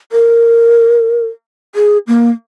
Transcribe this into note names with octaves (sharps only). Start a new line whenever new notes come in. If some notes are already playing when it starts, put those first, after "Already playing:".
A#4
G#4
A#3